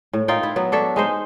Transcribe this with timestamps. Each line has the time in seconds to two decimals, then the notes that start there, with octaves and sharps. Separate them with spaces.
0.13 A2
0.28 D#4 F4 A#4 G5
0.43 E4
0.56 F#3 B3
0.72 D4 A4 C#5 E5
0.96 G#3 D#4 C5